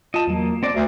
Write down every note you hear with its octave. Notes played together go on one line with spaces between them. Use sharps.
F4 D#5 A5
E2 F#3 A#3
C4 D5 A#6
D2 A#4 C5